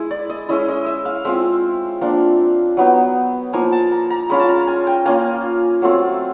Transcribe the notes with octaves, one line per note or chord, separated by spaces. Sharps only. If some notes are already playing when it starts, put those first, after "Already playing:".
Already playing: G#3 E4
D5
D#5
G#3 C#4 E4 D#5
D#5
E5
F5
G#3 C4 F4 E5
F3 A#3 D4
F#3 B3 D#4
F3 A#3 D#4 G#5
A5
A#5
A#5
G#3 C#4 F4 B5
A5
A#5
G#5
G5
A#3 C#4 F4 G#5
F#3 A3 C4 F4